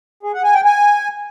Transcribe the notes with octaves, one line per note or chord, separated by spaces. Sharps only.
G#4
F#5
G#5
G5
G#5